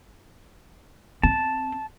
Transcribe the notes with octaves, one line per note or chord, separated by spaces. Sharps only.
C4 A5